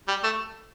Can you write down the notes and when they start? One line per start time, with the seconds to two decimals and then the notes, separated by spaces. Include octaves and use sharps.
0.08 G3
0.24 A3